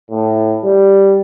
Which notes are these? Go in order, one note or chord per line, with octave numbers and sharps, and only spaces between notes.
A2
G3